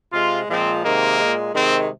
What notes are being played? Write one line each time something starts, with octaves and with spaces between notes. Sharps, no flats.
C3 G#3 F4
A#2 F3 G#3 C4
C3 D#3 G#3 A#3
A#2 G#3
C3 D#3 G#3 C4